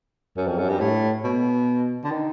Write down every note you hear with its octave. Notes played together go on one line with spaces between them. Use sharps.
F#2
F2
F#2
G2
A2
B2
D3
D#3